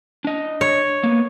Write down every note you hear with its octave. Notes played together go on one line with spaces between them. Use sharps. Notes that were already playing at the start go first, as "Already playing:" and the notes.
D4 D#5
C#5
A#3 B3